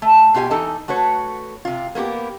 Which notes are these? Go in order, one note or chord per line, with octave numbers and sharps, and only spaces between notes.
A3
B2 F4 G4 E5 G#5
E3 D#4 A4 A5
A3 F#4 B4 C#5
C3 F4
A#3 B3 F#4 G4